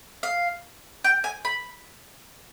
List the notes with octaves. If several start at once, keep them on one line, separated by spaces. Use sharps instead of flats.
F5
G5
G#5
B5